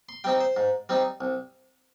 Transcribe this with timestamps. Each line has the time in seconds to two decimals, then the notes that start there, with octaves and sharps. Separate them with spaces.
0.09 C6
0.24 G3 C4 D#4 G5
0.40 C5
0.57 G#2
0.89 G3 C4 D#4
1.21 C2